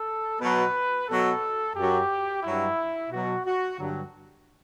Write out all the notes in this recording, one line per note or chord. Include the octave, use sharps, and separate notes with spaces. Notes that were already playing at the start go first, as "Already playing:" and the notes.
Already playing: A4
B2 F#3 B4
B2 F#3 A4
F#2 F#3 G4
G2 F#3 E4
B2 F#3 F#4
F#4
G2 D3 F#3